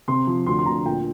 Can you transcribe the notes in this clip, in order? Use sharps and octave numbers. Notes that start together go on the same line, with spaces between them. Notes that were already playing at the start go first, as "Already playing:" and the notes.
C3 C6
F3
D2 C6
C6
D2 A#5
A#2 G5